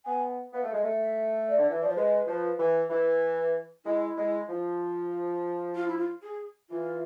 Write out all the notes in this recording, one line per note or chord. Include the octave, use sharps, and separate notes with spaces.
B3 G#5
B3 F5
A3
G#3
A3
E5
D5
D3
E3
F3 D5
C5
G#3 B4
F3
E3
E3
G#3 E4
G#3
F3
F4
E4
F4
G#4
E3 F4